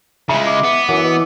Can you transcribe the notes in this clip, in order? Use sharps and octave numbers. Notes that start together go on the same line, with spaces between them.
C#3 G#3 E4 B5
D6
B3
F#2 E3 F#5 D6
B2